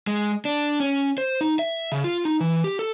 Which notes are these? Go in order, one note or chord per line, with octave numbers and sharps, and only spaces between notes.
G#3
D4
C#4
C5
D#4
E5
C#3
F4
D#4
E3
G4
A4